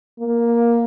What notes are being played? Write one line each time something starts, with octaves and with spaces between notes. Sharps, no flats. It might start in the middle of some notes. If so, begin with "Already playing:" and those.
A#3